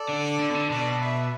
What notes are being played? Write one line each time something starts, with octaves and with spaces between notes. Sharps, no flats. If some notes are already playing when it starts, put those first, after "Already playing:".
Already playing: A4 D5
D3
D3
B2
D3
B2 A4 D5
B4 E5